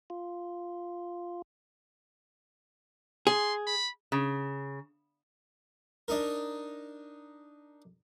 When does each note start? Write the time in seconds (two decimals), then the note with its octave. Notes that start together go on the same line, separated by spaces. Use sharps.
0.10 F4
3.27 G#4 C6
3.66 B5
4.12 C#3
6.08 D4 D#4 A#4